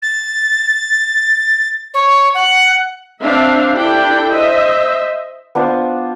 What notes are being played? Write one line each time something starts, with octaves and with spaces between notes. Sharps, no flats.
A6
C#5
F#5
C4 D4 E5 F5
D4 E4 G4 A4 G5
C5 D#5 E5
B3 D4 F4 C5